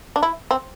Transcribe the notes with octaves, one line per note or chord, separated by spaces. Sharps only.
D4
E4
C4